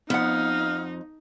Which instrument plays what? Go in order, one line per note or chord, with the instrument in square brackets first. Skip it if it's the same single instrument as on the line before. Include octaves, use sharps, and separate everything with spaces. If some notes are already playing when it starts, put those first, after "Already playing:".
[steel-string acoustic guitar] F2 [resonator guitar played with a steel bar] B3 F#5 [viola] D#4 [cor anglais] F5